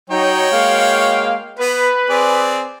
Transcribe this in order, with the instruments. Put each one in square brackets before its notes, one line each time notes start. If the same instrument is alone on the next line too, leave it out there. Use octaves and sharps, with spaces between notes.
[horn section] F#3 D#4 [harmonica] F#4 C#5 G5
[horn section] G#3 A#3 F5
[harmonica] B3 [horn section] B4
[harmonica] C4 G#4 D5